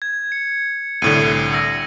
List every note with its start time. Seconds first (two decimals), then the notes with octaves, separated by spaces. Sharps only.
0.02 G#6
0.32 C#7
1.02 C2 A2 D3 D#7
1.53 E6 A#6